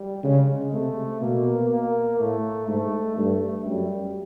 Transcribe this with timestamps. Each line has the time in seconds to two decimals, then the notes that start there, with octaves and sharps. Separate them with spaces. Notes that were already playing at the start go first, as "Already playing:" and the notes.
Already playing: G3
0.23 C#3 G#3
0.72 C3 A3
1.21 B2 A#3
1.70 A#3
2.19 A2 A3
2.67 G#2 A3
3.17 G2 A3
3.66 F#2 G3